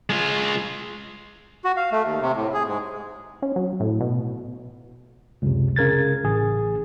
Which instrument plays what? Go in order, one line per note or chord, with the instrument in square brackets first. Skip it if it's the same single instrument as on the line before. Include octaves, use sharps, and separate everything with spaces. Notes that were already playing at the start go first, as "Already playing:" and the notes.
[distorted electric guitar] G#3 F4
[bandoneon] F#4
F5
A3
D#2
C3
A2
G#4
G#2
[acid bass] C#4
F#3
A2
B2
[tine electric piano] C#2 F#2 C3
C#3 A#4 G#6 A6
A1 G#4